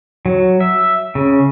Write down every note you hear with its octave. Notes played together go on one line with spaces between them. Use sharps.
F#3
E5
C#3